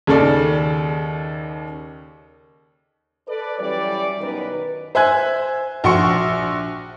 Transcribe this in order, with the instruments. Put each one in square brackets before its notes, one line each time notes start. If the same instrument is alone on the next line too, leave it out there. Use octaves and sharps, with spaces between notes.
[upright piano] D#2 C#3 A4 D5
[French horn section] A4 B4 D5
E3 F#3 G3 C#4 D5
F#2 B2 D#3 D#4 A#4 B4
[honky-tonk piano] C5 E5 G#5 F#6 G#6
A#1 F#4 C6 C#6 C#7